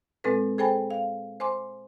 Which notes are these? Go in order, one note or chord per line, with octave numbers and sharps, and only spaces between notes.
A#2 G#3 C4 A4 B4
G#4 A4 C5 G5 G#5 B5
F5
C5 G#5 C6 D6